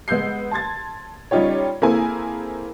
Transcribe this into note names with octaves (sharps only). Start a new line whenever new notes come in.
G#3 B3 E6 G6 C7
A5 C6 G#6 A6
G3 C#4 D#4 F4 G4 C#5
A#3 C4 E4 G#4 A4 G#5